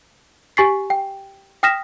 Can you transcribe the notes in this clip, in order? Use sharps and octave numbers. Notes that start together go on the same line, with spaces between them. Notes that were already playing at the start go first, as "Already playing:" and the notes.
G4 G#5 C#6 A6 B6 C7
G5
G5 D#6 F6 A#6 B6 E7